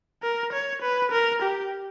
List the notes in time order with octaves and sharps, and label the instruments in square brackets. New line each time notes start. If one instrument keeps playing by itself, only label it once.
[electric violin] A#4
C#5
B4
A#4
G4